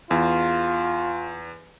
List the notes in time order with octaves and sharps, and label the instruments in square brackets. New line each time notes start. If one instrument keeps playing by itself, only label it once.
[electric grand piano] E2 [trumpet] F4